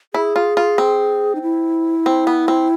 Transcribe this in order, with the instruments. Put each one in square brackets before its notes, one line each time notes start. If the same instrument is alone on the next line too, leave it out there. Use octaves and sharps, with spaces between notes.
[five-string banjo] E4 [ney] G#4
[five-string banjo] F4
F4
C4
[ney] D#4
E4
[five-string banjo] C4
B3
C4